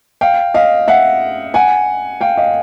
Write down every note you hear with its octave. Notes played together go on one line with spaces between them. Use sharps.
F5 G5
D#5 F5
E5 F#5
F#5 G#5
F5 G5
D#5 F5